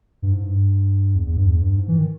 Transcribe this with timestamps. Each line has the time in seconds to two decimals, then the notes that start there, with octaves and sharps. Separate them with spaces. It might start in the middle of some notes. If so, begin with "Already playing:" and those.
0.22 G2
0.33 G#2
0.43 G2
1.15 E2
1.26 E2
1.37 G2
1.47 E2
1.62 G2
1.78 G#2
1.88 E3
1.98 D#3